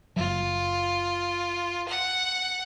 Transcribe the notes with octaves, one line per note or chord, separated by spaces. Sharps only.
F#1 F#3 F4
F#5